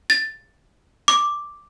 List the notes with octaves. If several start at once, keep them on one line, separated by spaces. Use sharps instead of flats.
A6
D6